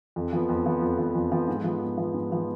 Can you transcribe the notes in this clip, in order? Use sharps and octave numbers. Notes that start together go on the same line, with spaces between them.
F2
F3 B3
F2
F3 B3
F2
F3 B3
F2
F3 B3
G#2
F3 B3
G#2
F3 B3
G#2
F3 B3